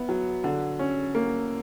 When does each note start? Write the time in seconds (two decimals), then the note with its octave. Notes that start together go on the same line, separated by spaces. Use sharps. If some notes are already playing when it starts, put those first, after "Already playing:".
Already playing: B3 E4
0.09 F#3
0.44 D3
0.79 C#4
1.15 A#3